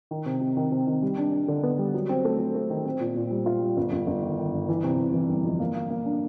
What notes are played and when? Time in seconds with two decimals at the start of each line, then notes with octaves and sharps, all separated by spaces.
0.11 D#3
0.26 C3
0.41 C3
0.57 D#3
0.72 C3
0.87 D#3
1.02 G3
1.18 D4
1.32 D4
1.48 D3
1.63 B3
1.78 G3
1.94 F#3
2.09 C4
2.25 A3
2.40 A3
2.55 A3
2.70 D#3
2.85 C4
3.01 A#2
3.16 A#2
3.31 G3
3.46 F4
3.62 G3
3.77 G1
3.92 G1
4.07 G1
4.22 D#3
4.38 D#3
4.53 G2
4.69 E3
4.84 C3
4.99 E3
5.14 E3
5.29 G1
5.44 F2
5.60 A#3
5.75 A#3
5.90 A#3
6.06 D4